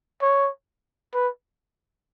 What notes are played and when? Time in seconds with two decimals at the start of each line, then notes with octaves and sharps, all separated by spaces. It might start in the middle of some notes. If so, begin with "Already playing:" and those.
0.22 C#5
1.14 B4